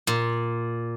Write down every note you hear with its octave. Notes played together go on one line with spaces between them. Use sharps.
A#2